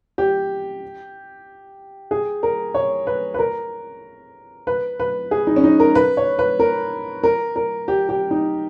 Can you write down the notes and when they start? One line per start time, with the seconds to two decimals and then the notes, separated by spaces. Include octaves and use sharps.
0.18 G4
2.11 G#4
2.43 A#4
2.74 C#5
3.07 B4
3.34 B4
3.39 A#4
4.67 B4
5.00 B4
5.31 G#4
5.47 D#4
5.56 C#4
5.64 D#4
5.80 A#4
5.95 B4
6.17 C#5
6.39 B4
6.59 A#4
7.23 A#4
7.56 A#4
7.88 G4
8.09 G4
8.31 D#4